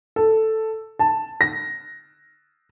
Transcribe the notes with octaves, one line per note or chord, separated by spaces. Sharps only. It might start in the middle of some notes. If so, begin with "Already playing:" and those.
A4
A5
A#6